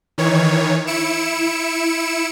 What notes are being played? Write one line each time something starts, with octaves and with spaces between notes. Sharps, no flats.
D#3 E3 C#5
E4 C#7 D7 E7